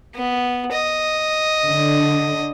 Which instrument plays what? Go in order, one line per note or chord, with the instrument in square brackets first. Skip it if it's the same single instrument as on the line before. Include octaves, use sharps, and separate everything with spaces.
[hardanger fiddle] B3
D#5
[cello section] D3 D4